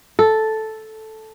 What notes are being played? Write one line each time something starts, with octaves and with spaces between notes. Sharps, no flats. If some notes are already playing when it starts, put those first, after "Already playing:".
A4